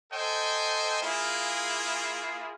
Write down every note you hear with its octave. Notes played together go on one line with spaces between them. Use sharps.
A4 C5 D#5 G5 G#5
A#3 E4 F4 G#4